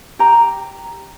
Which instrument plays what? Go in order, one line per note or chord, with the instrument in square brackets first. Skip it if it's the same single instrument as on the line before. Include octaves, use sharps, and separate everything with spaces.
[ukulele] G4 A#5